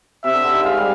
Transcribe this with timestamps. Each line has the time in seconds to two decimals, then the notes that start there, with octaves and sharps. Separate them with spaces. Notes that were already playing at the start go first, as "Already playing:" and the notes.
0.24 C3 E5
0.34 D3
0.44 D3
0.54 D#3
0.64 G#3 F5
0.77 G3